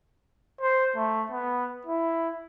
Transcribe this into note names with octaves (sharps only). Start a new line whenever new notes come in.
C5
A3
B3
E4